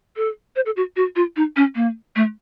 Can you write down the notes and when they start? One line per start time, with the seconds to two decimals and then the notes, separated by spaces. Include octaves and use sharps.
0.16 A4
0.56 C5
0.66 A4
0.76 F#4
0.96 F#4
1.16 F4
1.36 D#4
1.56 C#4
1.75 A#3
2.16 A3